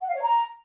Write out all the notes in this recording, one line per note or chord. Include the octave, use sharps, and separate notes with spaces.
F#5
F5
C#5
A#5